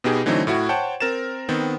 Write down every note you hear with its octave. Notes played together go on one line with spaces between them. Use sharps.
B2 B3 D#4 G4 G#4
D3 E3 F#3 A3 C4 D#4
A2 E4 F#4
C5 C#5 F#5 G5 A5
C4 A#4 A6 E7
D#3 B3 C4